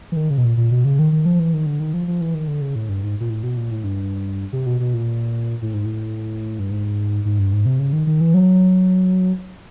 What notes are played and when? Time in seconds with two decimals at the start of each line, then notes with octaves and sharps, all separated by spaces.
0.12 E3
0.17 D#3
0.30 C#3
0.38 B2
0.44 A#2
0.57 A#2
0.71 B2
0.85 C#3
0.99 D#3
1.12 D#3
1.25 F3
1.39 E3
1.53 D#3
1.66 D3
1.80 D#3
1.94 F3
2.08 F3
2.21 E3
2.34 D#3
2.48 D3
2.61 C#3
2.75 A2
2.89 G2
3.03 G#2
3.20 A#2
3.30 A2
3.43 B2
3.57 A#2
3.71 A2
3.84 G2
4.53 C3
4.66 B2
4.80 B2
4.94 A#2
5.62 A2
5.74 G#2
5.85 A2
6.59 G2
6.71 G#2
7.25 G#2
7.39 G2
7.52 G#2
7.66 C3
7.79 C#3
7.93 D#3
8.07 D#3
8.21 E3
8.34 F#3